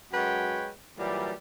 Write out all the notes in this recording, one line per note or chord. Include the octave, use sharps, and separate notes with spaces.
F#2 G#3 F#4 B4 C#5 G5
A#2 E3 F#3 G3